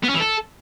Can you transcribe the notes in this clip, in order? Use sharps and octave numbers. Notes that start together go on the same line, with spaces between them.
B3
C#4
E3
A4